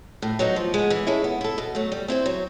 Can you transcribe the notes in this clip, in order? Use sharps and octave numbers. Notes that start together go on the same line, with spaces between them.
A2
F#3 B3 D#4
F3
G#3 B3
E3
G#3 C#4 E4 A4
B3
E4 A4
B2
F#3 A3
G3
C4 E4 G#4 C5
F#3